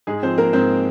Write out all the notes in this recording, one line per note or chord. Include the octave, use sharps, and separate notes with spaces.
G#2 G#3 G#4
F3 C4 C5
F3 A#3 A#4
G#2 C4 C5